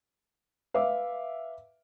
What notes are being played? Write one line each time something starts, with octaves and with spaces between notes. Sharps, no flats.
B4 E5 F5 D6